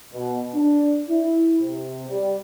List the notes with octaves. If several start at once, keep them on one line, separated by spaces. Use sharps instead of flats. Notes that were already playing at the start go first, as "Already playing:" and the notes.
B2
D4
E4
C3
G3